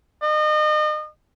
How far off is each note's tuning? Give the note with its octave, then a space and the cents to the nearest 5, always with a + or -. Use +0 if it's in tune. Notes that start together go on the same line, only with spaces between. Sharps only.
D#5 -35